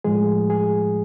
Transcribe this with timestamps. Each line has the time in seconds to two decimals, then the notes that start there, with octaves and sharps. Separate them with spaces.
0.04 A2 F3 G#3 G#4
0.50 G#4